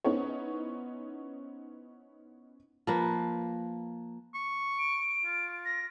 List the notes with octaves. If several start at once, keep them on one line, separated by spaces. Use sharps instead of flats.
B3 C#4 D#4 E4 C5 C#5
F3 A#3 B4
C#6
D7
F4
A#6